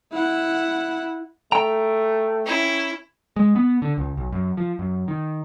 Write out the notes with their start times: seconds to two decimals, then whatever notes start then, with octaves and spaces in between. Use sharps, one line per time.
0.12 E4 F#5
1.52 A3 G5 A#5
2.45 C#4 E4
3.36 G#3
3.56 B3
3.82 D3
3.98 C#2
4.17 B1
4.33 F#2
4.57 F3
4.79 F#2
5.08 D#3